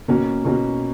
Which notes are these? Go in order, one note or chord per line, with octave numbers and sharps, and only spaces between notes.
B2 A#3 C#4 F#4
B2 A#3 C#4 F#4